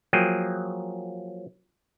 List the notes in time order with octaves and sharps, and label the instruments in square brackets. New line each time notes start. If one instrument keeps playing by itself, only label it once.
[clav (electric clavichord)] F3 F#3 A#3 G#4 G5